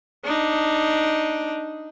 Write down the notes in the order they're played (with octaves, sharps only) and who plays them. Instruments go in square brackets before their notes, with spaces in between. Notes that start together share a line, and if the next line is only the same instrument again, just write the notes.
[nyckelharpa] D4 D#4